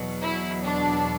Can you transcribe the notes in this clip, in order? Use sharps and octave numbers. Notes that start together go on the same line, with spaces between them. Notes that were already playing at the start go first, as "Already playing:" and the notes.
Already playing: E2 B2 F#3
E4
D4